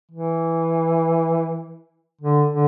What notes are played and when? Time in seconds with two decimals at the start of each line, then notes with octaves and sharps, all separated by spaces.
0.11 E3
2.21 D3
2.52 D3